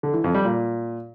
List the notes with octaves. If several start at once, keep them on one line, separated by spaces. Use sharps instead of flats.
D3
E3
F2
G3
A#2